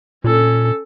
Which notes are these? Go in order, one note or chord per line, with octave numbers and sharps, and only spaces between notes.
A#2 C#4 A4